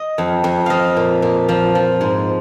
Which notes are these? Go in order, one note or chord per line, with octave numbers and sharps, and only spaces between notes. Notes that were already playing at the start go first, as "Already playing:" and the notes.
Already playing: D#5
F2
F2
F3 D#5 F5
A#2
A#2
F3
F3
G#2